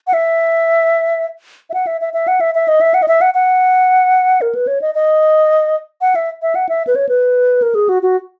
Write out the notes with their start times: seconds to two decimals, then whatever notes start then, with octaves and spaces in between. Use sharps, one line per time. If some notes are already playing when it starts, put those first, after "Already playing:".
0.07 F#5
0.14 E5
1.70 E5
1.74 F#5
1.87 E5
2.01 E5
2.14 E5
2.28 F#5
2.41 E5
2.55 E5
2.68 D#5
2.81 E5
2.94 F#5
3.02 D#5
3.08 E5
3.21 F#5
3.34 F#5
4.41 A#4
4.55 B4
4.67 C#5
4.81 D#5
4.95 D#5
6.01 F#5
6.16 E5
6.42 E5
6.55 F#5
6.69 E5
6.87 B4
6.96 C#5
7.09 B4
7.62 A#4
7.75 G#4
7.89 F#4
8.03 F#4